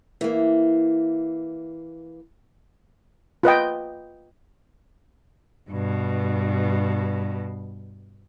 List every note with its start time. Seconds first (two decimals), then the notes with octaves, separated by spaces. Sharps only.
0.21 E3 A#3
3.43 F4 B4 D#5 G5
5.70 G2 B2